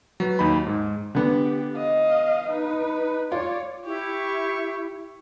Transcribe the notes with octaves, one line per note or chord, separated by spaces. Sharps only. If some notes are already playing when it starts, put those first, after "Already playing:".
F#3 B4
D#2 D#4 B5
G#2
D3 B3 G4
D#5 F5
D#4 B4
F4 C#5 D5
E4 G4 C#6